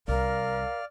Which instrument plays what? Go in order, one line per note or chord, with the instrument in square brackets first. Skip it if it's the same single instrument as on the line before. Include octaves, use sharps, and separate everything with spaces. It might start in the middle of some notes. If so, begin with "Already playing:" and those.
[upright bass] C2 [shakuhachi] A#4 [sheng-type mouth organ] D5 F6 [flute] F5